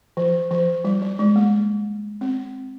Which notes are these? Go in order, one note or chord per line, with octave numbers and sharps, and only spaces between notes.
F3
F3
G3
G3
G#3
A#3
C4